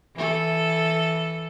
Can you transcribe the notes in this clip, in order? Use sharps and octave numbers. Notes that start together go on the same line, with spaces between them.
E3 A4